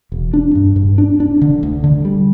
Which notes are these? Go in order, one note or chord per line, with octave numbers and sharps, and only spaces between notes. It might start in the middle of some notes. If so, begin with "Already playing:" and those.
E1
D4
G2
G2
D4
D4
D3
D2
D3
G3